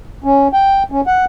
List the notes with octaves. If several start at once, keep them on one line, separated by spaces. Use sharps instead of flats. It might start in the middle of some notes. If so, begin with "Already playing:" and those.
C#4
G5
C#4
F#5